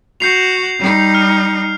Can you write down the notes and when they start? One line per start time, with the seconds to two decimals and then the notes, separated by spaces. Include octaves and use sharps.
0.20 F#4 G6 C7 F7
0.78 G3 D#4
1.14 F6